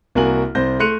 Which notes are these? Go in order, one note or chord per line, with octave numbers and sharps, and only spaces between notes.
C2 A#3 F#4 A#4 G#5 F#7
C2 C5 G6 A#6
A3 C6 F#6 C#7 D#7 F7